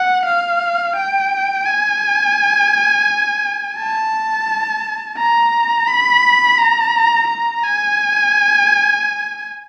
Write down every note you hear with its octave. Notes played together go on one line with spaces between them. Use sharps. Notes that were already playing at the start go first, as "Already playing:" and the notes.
Already playing: F#5
F5
G5
G#5
A5
A#5
B5
A#5
A#5
G#5